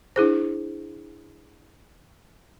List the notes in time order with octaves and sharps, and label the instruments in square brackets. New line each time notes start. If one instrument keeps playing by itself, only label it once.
[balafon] D4 E4 G#4 C5